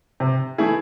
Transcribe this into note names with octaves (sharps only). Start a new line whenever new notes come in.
C3
E3 A3 E4 G#4